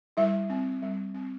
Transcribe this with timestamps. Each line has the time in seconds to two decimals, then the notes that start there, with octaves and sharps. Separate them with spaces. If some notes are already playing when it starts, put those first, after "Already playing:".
0.17 G3 E4 E5
0.50 C4
0.82 G3
1.14 C4